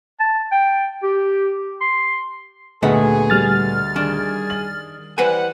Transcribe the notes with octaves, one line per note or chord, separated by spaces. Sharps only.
A5
G5
G4
C6
D2 A#2 A3 B3 G#4 D#5 F#5
G3 F6 A6
D#3 D4 G#4
F#7
E3 G3 B4 C5 F#5 G#5